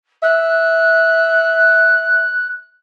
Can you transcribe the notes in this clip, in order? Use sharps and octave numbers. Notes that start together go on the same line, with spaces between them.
E5 F#6